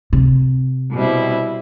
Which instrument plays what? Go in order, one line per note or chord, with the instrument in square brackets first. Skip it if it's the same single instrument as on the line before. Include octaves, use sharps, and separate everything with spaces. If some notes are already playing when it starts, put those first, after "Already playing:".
[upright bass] C3
[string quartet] B2 G3 C4 E4